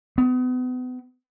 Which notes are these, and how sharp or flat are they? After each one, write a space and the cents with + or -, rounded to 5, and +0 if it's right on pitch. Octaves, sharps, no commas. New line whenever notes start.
B3 +35